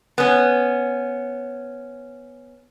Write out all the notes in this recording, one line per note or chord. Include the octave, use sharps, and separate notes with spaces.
B3 C#4